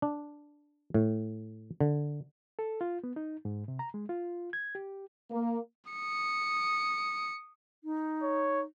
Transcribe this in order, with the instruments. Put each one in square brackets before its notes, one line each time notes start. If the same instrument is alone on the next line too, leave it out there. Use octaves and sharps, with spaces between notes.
[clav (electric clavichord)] D4
A2
D3
[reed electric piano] A4
F4
B3
D#4
G#2
C3
A#5
G#3
F4
G#6
G4
[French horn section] A#3
[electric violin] D#6 C#7
[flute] D#4
[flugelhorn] C#5